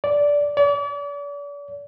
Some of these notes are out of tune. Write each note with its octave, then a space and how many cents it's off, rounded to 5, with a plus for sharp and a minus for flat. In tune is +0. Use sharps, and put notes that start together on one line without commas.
D5 -10
D5 -40